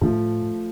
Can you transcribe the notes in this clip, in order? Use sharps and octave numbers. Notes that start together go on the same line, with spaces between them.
A2 F3 A3